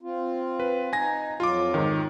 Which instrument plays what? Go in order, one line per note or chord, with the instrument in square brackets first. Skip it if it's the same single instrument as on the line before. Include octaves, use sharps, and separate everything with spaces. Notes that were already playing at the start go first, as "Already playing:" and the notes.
[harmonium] C4 F4
[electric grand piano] B4
[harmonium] D#4 [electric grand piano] G#5 A#6
[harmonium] F2 F#3 [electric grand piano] F4 D6
[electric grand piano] G#2 D#3